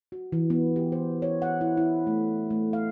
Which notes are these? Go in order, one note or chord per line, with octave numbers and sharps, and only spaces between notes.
F#4
E3
B3
G4
C5
C#5
F#5
E4
E4
A3
A3
F5